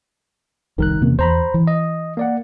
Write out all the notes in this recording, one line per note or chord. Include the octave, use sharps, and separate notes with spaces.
F1 C2 D#3 A#4 F#6
E2 C3 A#3 C#4
E2 C5 A#5 B5
E3
D#5
A#3 D5 F#5